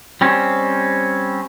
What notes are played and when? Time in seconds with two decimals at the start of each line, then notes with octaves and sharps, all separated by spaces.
0.21 G3 C4 C#4